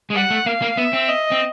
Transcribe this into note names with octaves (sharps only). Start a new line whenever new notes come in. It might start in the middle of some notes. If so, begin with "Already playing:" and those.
G#3
G3 F#5
A3
A#3 F5
A#3
B3 E5
C4
D#5
C4